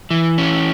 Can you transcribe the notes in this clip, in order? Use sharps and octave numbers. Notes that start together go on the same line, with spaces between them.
E3
C#4